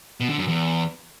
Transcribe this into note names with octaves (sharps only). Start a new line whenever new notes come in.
B2
D3
F#2
E2